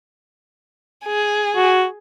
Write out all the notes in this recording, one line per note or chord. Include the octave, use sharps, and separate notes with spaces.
G#4
F#4